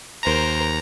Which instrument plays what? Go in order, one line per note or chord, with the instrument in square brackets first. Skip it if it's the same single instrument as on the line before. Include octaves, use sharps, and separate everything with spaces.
[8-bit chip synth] D#2 A#5 [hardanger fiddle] A#4 C5